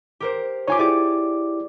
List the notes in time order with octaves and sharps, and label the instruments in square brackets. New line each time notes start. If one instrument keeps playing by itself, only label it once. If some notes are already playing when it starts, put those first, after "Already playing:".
[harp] G4 A#4 C5
[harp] D#4 F4 G4 [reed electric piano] C#5 G#5 D6
[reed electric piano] E4 G4 D6 [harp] G#4 C#5 D5